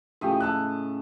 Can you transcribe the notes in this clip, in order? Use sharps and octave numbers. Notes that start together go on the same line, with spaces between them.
A2 C#3 F3 G4 D#5
A5 E6 F#6